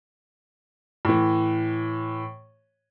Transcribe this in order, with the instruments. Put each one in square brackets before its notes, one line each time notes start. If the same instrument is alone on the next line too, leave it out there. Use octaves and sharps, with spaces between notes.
[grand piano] A2 E3